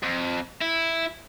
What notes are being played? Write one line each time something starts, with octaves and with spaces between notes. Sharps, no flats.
F2
E4